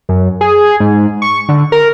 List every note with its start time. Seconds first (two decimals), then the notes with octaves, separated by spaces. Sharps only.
0.09 F#2
0.41 G#4
0.80 G#2
1.22 C#6
1.49 D3
1.72 A#4